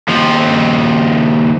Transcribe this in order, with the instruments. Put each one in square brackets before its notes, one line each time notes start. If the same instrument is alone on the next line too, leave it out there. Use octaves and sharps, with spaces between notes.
[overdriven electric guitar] D#2 F3